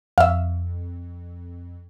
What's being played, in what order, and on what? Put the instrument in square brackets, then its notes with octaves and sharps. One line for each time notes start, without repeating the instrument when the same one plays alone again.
[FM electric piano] F2 [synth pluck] E5 F5